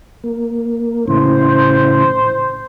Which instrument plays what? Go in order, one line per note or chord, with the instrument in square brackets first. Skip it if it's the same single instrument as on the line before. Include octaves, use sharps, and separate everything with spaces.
[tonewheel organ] A#3
[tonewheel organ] A2 C#3 E3 [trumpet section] C5